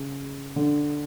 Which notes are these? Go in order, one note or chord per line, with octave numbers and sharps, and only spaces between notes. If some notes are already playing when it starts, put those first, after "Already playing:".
Already playing: C#3
D3